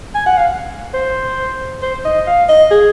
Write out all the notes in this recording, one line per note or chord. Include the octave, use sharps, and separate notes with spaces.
G#5
F#5
F5
C5
C5
D#5
F5
D#5
G#4